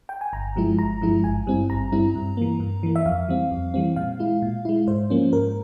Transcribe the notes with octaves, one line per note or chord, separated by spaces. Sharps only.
G5
G#5
G1 A#5
G2 F3 G#3 E4
G1 A#5
G2 F3 G#3 E4
G#1 G#5
G2 G3 C4 E4
G#1 A#5
G2 G3 C4 E4
G2
E3 A#3
G2
E3 A#3
E5
F2 F5
E3 G3 C4
F2
E3 G3 C4
A#2 F5
G#3 E4
A#2
G#3 E4
G#2 C5
F3 A#3 C#4
G#2 A#4